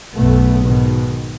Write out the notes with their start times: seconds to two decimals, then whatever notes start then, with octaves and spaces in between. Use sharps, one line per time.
0.15 B1 F#2 B2 A3 B3
0.63 G#2 B2 D#3